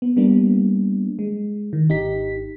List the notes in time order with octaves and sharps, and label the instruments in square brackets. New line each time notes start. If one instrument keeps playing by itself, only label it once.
[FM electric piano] B3
G3 A#3 B3 D4
G#3
D#3
G#1 D#4 G4 B6